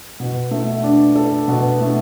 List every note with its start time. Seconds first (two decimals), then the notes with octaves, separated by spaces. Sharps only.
0.20 B2
0.51 A3
0.84 D4
1.15 A4
1.48 B2
1.81 A3